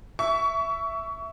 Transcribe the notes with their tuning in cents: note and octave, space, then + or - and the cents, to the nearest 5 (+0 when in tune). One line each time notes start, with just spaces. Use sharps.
E5 +0 C#6 +25